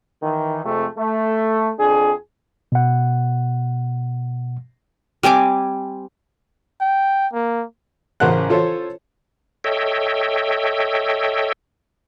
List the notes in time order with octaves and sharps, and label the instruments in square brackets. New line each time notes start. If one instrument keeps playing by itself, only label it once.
[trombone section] D#3 E3
F2 C3 G#3 A3
A3
F2 D4 G#4
[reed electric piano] B2 F#5
[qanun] G3 C4 G#5 D6
[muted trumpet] G5
A#3
[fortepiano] A1 C#3 A#4 C5 F#5 F#6
F4 A4 C5 C#5
[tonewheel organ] A4 C#5 D#5 E5 G5